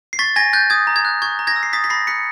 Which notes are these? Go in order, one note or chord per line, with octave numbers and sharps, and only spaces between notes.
C7
C#6 A6 B6
G#5 G#6 A#6
F#6 G6 A6
D#6 G#6
A#5
G#6
F#6
C#6 G#6
A#5
G#6 A#6
E6
C7
D#6 A6 B6
B6
B5 A#6 C7
F#6 B6 C#7